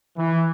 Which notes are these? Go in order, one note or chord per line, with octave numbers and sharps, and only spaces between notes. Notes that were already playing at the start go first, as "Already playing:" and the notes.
E3